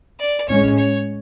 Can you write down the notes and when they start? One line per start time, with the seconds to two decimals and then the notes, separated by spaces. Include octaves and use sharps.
0.20 D5
0.48 A2 G#3 C#4 C#5
0.77 C#5